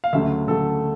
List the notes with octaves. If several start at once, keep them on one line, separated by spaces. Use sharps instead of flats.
F5
D2 C#3 F#3 A3 E5
D2 C#3 F#3 A3 A4